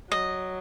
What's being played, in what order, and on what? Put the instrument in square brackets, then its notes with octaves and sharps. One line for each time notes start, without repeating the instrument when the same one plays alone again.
[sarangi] F#3 [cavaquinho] D#5